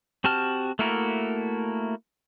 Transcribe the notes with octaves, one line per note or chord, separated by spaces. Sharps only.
C4 F#4 G4 A5 F6
A3 A#3 E4 F#4 A#4